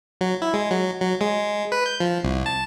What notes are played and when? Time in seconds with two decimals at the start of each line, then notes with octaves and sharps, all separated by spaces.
0.21 F#3
0.42 E4
0.54 G#3
0.71 F#3
1.01 F#3
1.21 G#3
1.72 B4
1.86 G6
2.00 F3
2.23 C2
2.46 A5